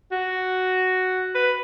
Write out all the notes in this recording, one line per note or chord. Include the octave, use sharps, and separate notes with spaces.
F#4
B4